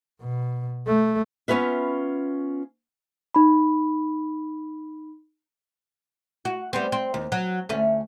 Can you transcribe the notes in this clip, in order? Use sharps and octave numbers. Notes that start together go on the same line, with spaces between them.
B2
A3
B3 C#4 F4 B4 E5
D#4 B5
F#4
G3 B3 C4
C4
D#2
F#3
D2 A3 C#4